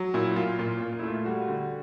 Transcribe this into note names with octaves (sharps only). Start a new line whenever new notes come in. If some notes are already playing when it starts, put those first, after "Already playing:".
Already playing: F#3
A#2 E4
A#2 F4
A#2 F4
A#2
F4
E4
A3 F4
G3 F#4
D3